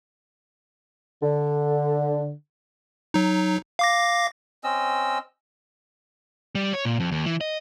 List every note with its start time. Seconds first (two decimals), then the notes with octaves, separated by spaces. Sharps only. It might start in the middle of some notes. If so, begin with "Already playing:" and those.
1.23 D3
3.14 F#3 D#4
3.79 F5 D6 A#6
4.64 C4 C#4 D#5 E6
6.55 G3
6.73 C#5
6.85 A#2
7.00 F2
7.12 D#2
7.26 E3
7.41 D#5